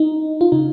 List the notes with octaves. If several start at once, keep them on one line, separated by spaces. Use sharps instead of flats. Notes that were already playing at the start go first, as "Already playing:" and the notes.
Already playing: D#4
F4
C#3 D#4